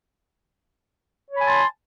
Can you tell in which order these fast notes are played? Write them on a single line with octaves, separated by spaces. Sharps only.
C#5 B5 G#5 A5 C6